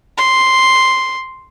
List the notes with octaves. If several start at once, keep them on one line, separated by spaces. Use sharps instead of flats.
C6